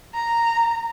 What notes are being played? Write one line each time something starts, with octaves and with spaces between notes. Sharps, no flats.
A#5